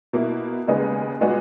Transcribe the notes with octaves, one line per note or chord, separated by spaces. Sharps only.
B2 A#3 E4
D#2 C#3 G#3 B3 D#4
A#2 G#3 B3 D#4 F#4